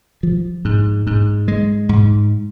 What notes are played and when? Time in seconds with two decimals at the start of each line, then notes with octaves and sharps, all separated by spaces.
0.23 F3
0.65 G#2
1.07 G#2
1.48 G#3
1.89 G#2